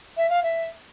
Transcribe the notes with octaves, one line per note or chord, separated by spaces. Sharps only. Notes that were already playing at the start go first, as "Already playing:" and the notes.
E5
F5
E5